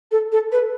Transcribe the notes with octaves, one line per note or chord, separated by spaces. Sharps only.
A4
A4
B4